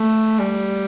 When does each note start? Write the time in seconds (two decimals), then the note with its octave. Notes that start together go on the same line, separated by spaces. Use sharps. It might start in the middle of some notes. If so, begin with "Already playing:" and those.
Already playing: A3
0.39 G3